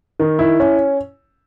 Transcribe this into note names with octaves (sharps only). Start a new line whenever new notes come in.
D#3
E4
C#4